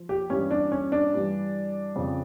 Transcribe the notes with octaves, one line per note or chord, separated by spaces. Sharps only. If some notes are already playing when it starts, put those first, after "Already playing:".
Already playing: F3
G4
G2 E3 G3 C#4
D4
C#4
D4
G2 E3 G3
F2 C#3 F3